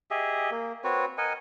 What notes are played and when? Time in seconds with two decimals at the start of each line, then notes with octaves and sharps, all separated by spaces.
0.11 G4 G#4 D#5 E5
0.51 A#3
0.84 C4 F#4 B4 C#5
1.18 A#4 D#5 F#5 G#5